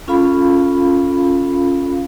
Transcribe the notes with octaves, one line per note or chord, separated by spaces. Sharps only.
C#4 F4 A4 F5 B5